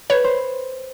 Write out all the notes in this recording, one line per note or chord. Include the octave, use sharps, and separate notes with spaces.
B4 C#5
C5